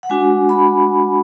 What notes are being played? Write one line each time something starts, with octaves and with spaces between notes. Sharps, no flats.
F#5
G#3 D4 F#4 G#5
B5